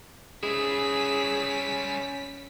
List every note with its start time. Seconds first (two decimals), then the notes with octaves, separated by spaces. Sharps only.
0.43 G3 C#4 E4 G#4 B6